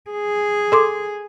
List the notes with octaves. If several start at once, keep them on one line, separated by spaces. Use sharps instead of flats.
G#4
A4 C6 D6